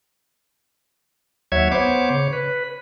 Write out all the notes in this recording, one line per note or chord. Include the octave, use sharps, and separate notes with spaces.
D#2 F#3 C#5 E5 G#6
B3 C5 C#5 D6
C#3 C#5
B4